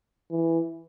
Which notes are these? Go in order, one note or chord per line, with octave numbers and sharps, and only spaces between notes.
E3